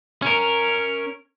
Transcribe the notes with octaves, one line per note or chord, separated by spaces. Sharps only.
C#4 A#4